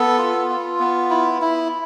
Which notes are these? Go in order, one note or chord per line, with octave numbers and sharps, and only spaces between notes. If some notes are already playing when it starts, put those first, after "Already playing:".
Already playing: B3 A4
F4
F4
B3
E4
E4